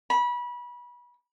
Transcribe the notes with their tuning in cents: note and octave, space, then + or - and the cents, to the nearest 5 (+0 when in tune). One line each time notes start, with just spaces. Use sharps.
B5 -25